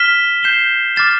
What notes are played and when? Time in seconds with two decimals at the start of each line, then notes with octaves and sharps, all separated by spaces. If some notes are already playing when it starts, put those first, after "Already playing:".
Already playing: F6 B6 E7 G7
0.43 G6 C7 E7 G7
0.96 D6 F6 A6 E7